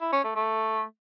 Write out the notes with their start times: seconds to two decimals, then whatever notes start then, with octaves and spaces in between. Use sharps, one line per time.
0.01 E4
0.12 C#4
0.24 A3
0.35 A3